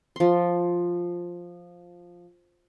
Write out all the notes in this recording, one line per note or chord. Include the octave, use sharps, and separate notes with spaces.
F3 C6